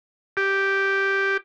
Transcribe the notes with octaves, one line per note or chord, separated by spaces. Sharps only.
G4